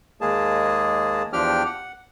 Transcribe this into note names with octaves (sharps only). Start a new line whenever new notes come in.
D#2 G#3 A#3 G#4 A5
E2 F3 D4 G4 G5 F6
F#5